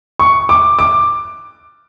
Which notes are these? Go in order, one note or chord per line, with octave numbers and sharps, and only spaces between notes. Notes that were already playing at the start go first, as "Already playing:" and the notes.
C#6
D6
D6